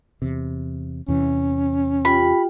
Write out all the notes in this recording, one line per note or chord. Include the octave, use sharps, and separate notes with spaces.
E2 C3
E2 C3 E3 C#4
F4 G4 G5 B5